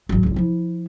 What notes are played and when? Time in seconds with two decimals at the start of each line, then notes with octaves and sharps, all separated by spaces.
0.09 G#1 F#3
0.23 F1 C#2
0.36 F3 E4